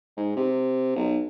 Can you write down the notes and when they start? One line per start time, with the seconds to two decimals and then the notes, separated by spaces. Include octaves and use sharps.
0.17 G#2
0.37 C3
0.96 B1